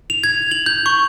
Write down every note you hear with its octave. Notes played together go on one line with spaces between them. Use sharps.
F7
G#6
F#7
G6
C#6